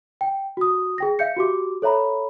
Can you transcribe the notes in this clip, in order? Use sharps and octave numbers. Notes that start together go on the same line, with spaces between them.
G5
F#4 D#6
G#4 G5 A#6
E5 F5 G6 C#7
F#4 G4 D6
A4 C#5 E5 A#5 B5